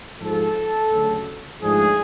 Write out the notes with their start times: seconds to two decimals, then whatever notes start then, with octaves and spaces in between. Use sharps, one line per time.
0.20 G#2 F3 G#3 A4
0.91 D2 C#3 F#3
1.62 G#2 F3 A3 D4 G#4